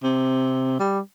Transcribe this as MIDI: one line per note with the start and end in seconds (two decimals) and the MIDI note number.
0.03 0.75 48
0.80 0.99 55